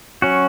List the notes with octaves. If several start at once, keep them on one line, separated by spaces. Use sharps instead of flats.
F#3 C#4 F#4